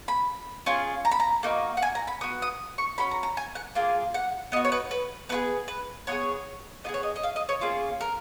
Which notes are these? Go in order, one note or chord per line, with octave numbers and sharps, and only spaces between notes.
B5
C#4 F4 G#4
A#5
B5
A#5
A#3 D#4 F#4
F#5
G#5
A#5
B5
B3 F#4 D#6
D#6
C#6
C#4 F#4 B5
A#5
A#5
G#5
F#5
A#3 F4 G#4
F#5
B3 F#4 D#5
C#5
B4
B4
B3 F4 G#4 B4
B4
B3 F4 G#4 C#5
B3 F4 G#4 D#5
C#5
D#5
D#5
F5
D#5
C#5
A#3 C#4 F4 G#4
A#4